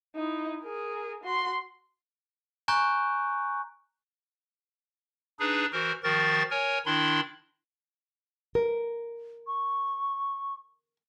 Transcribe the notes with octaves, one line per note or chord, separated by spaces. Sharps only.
D#4 E4
G#4 A#4
F#4 C6
G#5 A#5 C#6 F#6 G6
D4 D#4 G#4 B4
E3 F#4 A#4 C5
D#3 F3 F#4 A#4 A6
A#4 C#5 G#5
D#3 D4 E4 B5 C6
A#4
C#6